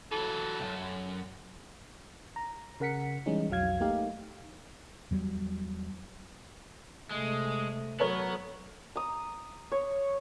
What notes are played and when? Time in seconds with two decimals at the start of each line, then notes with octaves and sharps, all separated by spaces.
0.12 E3 F#3 A4
0.59 C2 F#2
2.36 A#5
2.80 C#3 A#4 F#5 B6 C#7
3.26 E3 G3 G#3 C#4 D#4
3.50 B1 F2 F#3 F5 G#6
3.80 A3 A#3 D#4 G4 F5
5.11 E2 F#3 G3
7.11 C3 G#3 A3
8.00 F#3 B3 A4 A#4 C#5
8.96 A#5 D#6
9.72 C#5